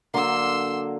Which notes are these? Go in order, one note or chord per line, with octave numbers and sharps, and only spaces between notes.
D3 F#3 A#3 C6 E6